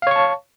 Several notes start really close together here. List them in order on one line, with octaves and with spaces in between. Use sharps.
F5 C#5 C#6 A5